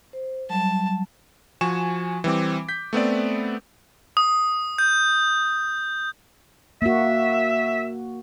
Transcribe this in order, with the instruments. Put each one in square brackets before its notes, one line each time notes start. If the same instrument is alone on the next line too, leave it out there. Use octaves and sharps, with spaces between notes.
[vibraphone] C5
[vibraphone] F#3 G3 [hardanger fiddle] A5
[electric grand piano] F3 F#4 G#5 C#6 E7
E3 G3 C4 D6
G6 B6
A3 B3 C4 D5
[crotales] D#6
G6
[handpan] A#3 F#4 [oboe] E5